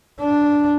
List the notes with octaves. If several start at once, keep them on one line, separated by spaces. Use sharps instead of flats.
D4